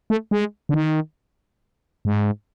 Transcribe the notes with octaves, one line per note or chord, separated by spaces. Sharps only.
A3
G#3
D3
D#3
G#2